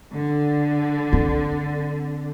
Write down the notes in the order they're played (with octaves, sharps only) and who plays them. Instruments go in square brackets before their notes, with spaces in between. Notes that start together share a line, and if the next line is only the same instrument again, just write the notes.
[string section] D3
[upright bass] C4